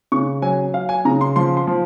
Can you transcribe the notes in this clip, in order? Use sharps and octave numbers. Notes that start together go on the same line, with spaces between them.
C#3 C#6
F#3 G#5
F#3 F5
G#5
C#3 A#5
C6
F3 C6
C6
F3